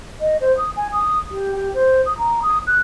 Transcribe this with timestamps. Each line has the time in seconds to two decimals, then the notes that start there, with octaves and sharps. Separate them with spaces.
0.21 D#5
0.41 C5
0.58 D#6
0.76 G#5
0.92 D#6
1.31 G4
1.56 G4
1.74 C5
2.06 D#6
2.18 A#5
2.42 D#6
2.67 F#6